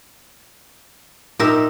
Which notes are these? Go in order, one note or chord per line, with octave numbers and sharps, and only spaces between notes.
A#2 D#4 G4 A#4 E5